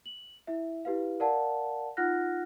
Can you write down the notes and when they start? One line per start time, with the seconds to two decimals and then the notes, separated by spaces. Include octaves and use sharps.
0.06 F#7
0.47 E4 E5
0.85 E4 G4 B4 F5
1.20 A#4 D5 F5 F#5 A5
1.97 D#4 F4 F#5 F6 F#6 A#6